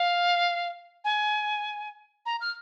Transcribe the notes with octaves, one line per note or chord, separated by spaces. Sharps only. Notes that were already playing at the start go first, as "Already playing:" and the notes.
Already playing: F5
G#5
A#5
F6